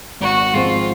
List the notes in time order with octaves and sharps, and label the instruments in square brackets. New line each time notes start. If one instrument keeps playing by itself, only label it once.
[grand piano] G#1 [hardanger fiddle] F#4
[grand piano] G#2 F3 G#3 C4 [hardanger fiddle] F4